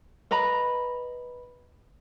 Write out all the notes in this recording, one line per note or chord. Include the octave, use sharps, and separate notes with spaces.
B4 D#5 A#5 B5